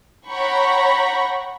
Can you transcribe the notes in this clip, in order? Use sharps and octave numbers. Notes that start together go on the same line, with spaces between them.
C#5 F#5 G5 A#5 B5 C#6